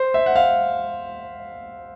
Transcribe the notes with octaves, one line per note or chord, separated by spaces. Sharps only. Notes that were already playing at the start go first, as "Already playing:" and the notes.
Already playing: C5
E5
F#5
F5